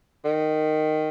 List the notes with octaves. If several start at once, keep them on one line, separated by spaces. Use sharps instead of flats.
D#3